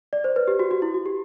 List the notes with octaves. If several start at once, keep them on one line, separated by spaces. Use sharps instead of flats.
D5
C5
B4
G4
F#4
F#4
E4
F#4
G4